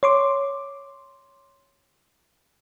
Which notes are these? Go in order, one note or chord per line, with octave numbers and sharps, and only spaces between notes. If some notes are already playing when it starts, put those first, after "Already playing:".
C#5 C6 D6